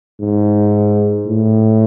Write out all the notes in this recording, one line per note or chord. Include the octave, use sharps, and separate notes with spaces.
G#2
A2